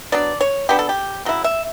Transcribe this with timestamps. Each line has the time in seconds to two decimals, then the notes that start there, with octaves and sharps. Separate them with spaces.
0.12 F#3 B3 D4 D5
0.41 C#5
0.69 F#3 B3 D4 G4
0.79 A4
0.89 G4
1.25 C#3 F#3 E4
1.44 E5